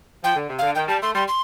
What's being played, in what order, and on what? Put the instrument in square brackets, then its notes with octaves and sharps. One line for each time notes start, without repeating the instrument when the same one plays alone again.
[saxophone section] F3 [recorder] G5
[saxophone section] D3
C3
[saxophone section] D3 [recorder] F5
[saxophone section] D#3 [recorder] G5
[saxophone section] G3 [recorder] A5
[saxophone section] A3 [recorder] C6
[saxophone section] G3 [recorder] C6
[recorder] C6